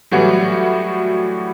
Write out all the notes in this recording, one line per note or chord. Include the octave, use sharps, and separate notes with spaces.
A2 E3 F#3 G3 F#4